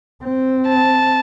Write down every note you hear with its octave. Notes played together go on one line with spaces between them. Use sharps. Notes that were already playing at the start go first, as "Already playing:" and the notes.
C4
A5